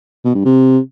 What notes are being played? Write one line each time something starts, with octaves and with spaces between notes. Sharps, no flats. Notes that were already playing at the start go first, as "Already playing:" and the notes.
B2
G2
C3